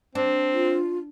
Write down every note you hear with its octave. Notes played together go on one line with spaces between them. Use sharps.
C4 D4
F4